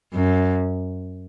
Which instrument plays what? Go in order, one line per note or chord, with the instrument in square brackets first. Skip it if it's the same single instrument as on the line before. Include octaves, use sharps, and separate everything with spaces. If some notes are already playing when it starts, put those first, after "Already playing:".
[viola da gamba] F#2